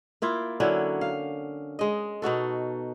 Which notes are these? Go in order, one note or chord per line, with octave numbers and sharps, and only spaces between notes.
A#3 E4 F4
D3 F#3 C#4 E4
F5
G#3 D#5
B2 D#4 F#4 A4